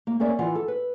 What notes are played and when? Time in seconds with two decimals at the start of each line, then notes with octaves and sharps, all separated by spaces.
0.07 A#3
0.19 A#3 C#4 A#4 D5 E5
0.39 E3 F4 F#5
0.55 A4
0.68 B4